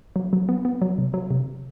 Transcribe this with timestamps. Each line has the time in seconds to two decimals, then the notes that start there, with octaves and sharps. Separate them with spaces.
0.16 F#3
0.33 F#3
0.49 B3
0.65 B3
0.82 F#3
0.98 C3
1.14 F#3
1.31 C3